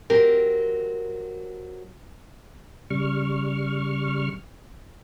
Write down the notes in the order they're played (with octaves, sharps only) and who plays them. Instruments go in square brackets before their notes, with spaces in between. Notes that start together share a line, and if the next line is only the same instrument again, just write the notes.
[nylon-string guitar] F#3 C4 G4 A#4
[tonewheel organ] C#3 G3 C#6 F6